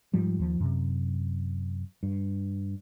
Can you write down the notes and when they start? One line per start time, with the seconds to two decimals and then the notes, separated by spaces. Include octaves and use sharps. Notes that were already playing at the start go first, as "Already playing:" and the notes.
0.14 G#2 F3 G3
0.39 D#2 F3
0.60 F#2 C3
2.03 G2